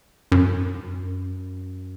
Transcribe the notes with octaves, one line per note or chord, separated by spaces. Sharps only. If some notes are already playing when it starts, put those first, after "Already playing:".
F#2